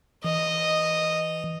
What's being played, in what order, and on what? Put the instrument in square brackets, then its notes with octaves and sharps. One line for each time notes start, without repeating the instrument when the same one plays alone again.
[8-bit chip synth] E3 [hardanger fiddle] D#5